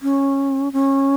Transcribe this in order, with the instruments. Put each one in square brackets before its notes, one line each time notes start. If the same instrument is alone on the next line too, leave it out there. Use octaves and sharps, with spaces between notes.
[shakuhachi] C#4
C#4